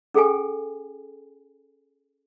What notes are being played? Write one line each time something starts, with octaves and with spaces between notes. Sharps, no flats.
C#4 G#4 A4 G5 G#5